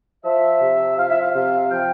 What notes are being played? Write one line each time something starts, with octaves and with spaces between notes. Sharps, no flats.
F3 E5
C3
F3 F5
E5
F5
C3 F5
F3 G5